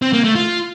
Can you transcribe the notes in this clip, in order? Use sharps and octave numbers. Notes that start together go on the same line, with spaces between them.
C4
A#3
A3
F4